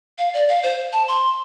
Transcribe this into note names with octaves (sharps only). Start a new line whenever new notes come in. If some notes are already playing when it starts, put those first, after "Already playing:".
F5
D5
F5
C5
A5
C6